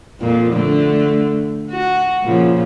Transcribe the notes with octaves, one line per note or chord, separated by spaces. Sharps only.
F2 A#2 F3
D3 A3
F#4
A#2 C#3 F3